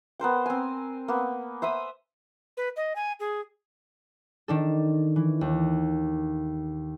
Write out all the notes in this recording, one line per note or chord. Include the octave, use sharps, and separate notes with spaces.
B3 A#4 C5 G5
C4 G#5
A#3 B3
C5 E5 B5 D#6
B4
D#5
G#5
G#4
D#3 D4 A4
E3
D#2